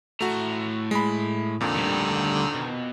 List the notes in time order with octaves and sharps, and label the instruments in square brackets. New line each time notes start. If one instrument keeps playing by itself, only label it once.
[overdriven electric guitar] A2 A#5 [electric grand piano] A3 F#4
[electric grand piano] G#3 B5
[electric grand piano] F2 A#2 [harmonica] D3 D#3
[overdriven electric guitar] D2 G3
B2